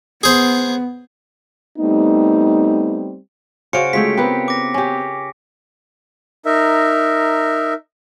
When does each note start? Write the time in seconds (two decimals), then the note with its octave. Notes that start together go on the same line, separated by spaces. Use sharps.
0.23 B3 G#4 C5
1.79 G3 A3 B3 C4 D#4
3.73 C#3 F#4 C5 F5 C#7 D7
3.93 G#3 A3 F4 C#5 G5 B6
4.17 B3 C4 G4 A#4 B4
4.48 D6 A#6
4.74 C#4 G4
6.46 D#4 A#4 E5